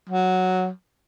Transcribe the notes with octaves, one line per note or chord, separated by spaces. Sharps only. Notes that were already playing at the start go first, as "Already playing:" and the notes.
F#3